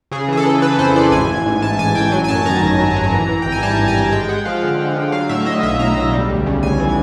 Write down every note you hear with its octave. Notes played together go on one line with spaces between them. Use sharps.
C#3 G#4
E3 G#4
A4
E3
E3 B4
F2 C5
E3 D5
A1 G#5
A1
G#2
G#2 A5
A1 G#5
A1 G5
F#3 G#5
G#5
F#2 A5
D#3 A#5
G#1
F#3
F#3
E3
E3
G#1 G5
G#5
G3 A5
G2
G#5
G#1
G#3 G5
G#3 F#5
F3 F5
D3
D3
D3
F#3 F5
A2 E5
A2 D#5
B1 E5
A2 A#5
B1
G3
D2
C#3
D2 G#5
E3